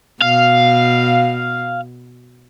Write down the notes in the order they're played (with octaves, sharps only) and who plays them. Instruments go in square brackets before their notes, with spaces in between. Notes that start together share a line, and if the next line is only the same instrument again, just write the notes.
[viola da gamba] B2 [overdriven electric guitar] F5